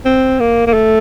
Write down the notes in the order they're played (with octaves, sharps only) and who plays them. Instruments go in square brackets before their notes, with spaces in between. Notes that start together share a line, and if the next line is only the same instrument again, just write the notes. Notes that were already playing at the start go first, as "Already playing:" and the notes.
[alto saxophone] C4
A#3
A#3
A3